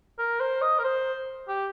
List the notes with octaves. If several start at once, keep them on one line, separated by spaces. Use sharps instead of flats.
A#4
C5
D#5
A#4
C5
G4